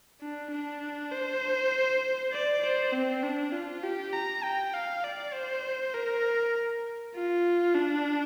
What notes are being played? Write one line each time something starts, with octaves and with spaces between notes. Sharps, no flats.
D4
D4
C5
D5
C5
C4
D4
F4
G4
A#5
G5
F5
D5
C5
A#4
F4
D4